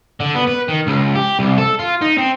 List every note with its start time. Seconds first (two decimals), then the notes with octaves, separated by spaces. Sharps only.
0.20 D3
0.34 B3
0.47 B4
0.68 D#3
0.87 C#2
1.15 G4
1.39 C2
1.58 A4
1.79 F4
2.02 D#4
2.18 C4